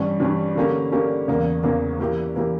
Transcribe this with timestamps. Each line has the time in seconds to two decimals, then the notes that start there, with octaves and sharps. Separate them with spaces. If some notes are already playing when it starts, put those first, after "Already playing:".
Already playing: G2 E3 G3 C#4
0.20 G2 E3 G3 C#4
0.55 D3 A#3 C#4 G4
0.92 D3 A#3 C#4 G4
1.28 E2 C#3 E3 A#3
1.63 E2 C#3 E3 A#3
1.99 E3 A#3 E4 G4
2.36 E3 A#3 E4 G4